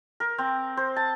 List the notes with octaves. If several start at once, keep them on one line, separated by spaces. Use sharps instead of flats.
A#4
C4
C5
A5